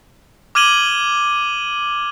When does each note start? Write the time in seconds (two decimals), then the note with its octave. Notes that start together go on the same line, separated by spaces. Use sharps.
0.55 D6 F6 G#6 D#7 F#7 G7